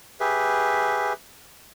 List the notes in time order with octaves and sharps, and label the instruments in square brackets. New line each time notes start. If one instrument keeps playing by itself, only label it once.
[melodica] G4 G#4 B4 E5